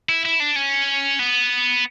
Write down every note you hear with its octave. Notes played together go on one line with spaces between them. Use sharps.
E4
E4
D4
C#4
B3